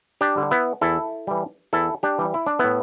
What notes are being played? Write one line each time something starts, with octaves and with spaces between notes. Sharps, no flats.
D4 G4
D3 G3
B3 E4
E2 E4 A4
E3 G3
E2 E4 A4
D4 G4
E3 G3
E4
D4
A2 B3 E4